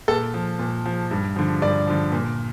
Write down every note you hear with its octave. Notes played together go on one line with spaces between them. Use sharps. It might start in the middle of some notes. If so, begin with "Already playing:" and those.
A#2 A4
F3
A#2
F3
G2
D3 F3
G2 D5
D3 F3
A#2